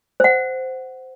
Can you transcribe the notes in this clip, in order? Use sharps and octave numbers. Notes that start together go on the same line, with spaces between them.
C5 F#5